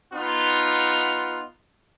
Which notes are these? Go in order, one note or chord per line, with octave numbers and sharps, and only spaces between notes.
B3 D#4 F4